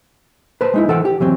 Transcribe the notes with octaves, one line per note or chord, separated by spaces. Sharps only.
B4 C5 A5
G#3 D#4 E4
E3 A4 F#5 G5
G4
E3 F#3 C4